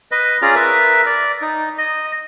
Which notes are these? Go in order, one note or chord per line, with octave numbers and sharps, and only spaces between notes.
B4 D#5
C#4 F4 G#4 D5 A#5
A#4 B4 E5
D5
D#4
D#5